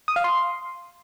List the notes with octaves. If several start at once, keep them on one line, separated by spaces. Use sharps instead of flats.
D#6
F5
C6